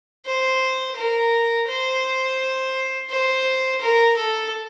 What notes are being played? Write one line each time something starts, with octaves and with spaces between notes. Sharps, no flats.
C5
A#4
C5
C5
A#4
A4